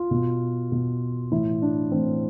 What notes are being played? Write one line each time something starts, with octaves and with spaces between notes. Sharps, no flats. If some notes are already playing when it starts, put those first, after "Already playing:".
Already playing: F4
B2
B2
A2 E3 E4
D4
A2 E3 C4